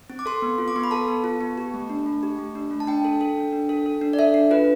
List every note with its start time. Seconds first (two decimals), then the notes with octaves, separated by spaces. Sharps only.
0.10 C4
0.19 D6
0.26 A4 C6
0.42 B3
0.58 F4
0.68 D6
0.76 B3 C6
0.84 B5
0.91 A4 A5
1.08 B3
1.24 F4
1.41 B3
1.58 G4
1.74 A3
1.90 D4
2.06 A3
2.23 G4
2.38 A3
2.55 D4
2.71 A3
2.80 A5
2.87 D4 G5
3.05 A4
3.21 A4
3.37 D4
3.52 D4
3.69 A4
3.86 A4
4.01 D4
4.13 D5
4.19 A4 E5
4.34 D4
4.51 F4 B4